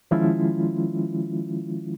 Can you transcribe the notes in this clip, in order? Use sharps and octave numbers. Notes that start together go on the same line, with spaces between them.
D#3 F3 G#3 C#4 E4 F4